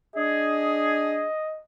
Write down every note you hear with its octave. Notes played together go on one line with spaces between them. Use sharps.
D4 G#4 D#5